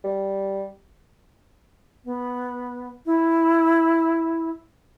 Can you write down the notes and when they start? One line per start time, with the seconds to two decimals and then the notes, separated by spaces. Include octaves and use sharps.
0.04 G3
2.04 B3
3.06 E4